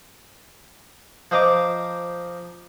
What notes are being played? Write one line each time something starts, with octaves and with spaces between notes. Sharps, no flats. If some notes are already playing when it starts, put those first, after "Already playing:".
F3 C5 D#5 A#5 D6